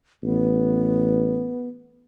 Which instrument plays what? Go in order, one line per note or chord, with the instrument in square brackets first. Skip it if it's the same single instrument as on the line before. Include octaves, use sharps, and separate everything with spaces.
[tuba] A1 [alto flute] B3